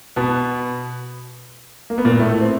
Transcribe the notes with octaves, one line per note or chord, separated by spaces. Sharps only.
B2 B3
A#3
B3
A#2 A#3
A2 A3
C4